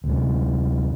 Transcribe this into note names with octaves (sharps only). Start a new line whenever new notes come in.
D2 C3